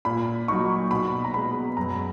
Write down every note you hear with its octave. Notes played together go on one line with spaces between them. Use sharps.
A#2 B5
F#3 A#3 D#4 C#6
B2 B5
A#5
G#3 B3 B5
F#2 A#5